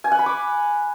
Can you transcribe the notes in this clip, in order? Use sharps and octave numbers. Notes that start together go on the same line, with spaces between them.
G#5
F#5
B5
D6